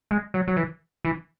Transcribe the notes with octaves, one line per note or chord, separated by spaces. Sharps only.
G#3
F#3
F#3
E3
E3